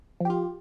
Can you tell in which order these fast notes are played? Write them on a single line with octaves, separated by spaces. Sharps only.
F3 G4 F4